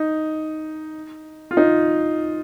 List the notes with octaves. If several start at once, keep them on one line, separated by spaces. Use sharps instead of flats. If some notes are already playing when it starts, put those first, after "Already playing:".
Already playing: D#4
F4
D#4